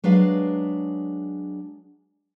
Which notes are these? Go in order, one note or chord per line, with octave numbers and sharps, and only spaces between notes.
F#3 G#3 D4 B4 F5